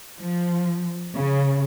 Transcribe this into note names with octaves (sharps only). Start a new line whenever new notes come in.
F3
C#3